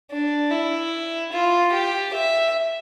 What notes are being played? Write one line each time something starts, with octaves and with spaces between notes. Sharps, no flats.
D4
E4
F4
G4
E5